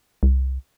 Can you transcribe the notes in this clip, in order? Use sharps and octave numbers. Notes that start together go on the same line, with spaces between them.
C2